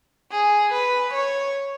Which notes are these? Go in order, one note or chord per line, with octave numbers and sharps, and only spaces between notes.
G#4
B4
C#5